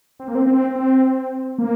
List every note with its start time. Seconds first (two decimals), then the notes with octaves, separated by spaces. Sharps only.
0.19 C4
0.28 A#3
0.35 C4
0.47 C4
0.76 C4
1.59 A#3